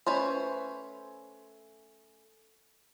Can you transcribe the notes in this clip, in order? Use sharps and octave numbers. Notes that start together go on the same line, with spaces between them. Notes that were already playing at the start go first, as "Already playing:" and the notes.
A3 C#4 B4 C5